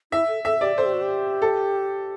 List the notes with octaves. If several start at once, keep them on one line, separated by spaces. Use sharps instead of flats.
E4 E5
A4
A4 E5
G4 D5
A4 C5
G4
F#4
G4
A4